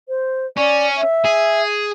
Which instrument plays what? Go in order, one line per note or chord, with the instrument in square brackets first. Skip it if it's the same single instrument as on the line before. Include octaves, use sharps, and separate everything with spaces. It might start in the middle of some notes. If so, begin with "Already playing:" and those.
[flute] C5
[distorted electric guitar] C#4 [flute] D5
[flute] E5
[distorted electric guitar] G#4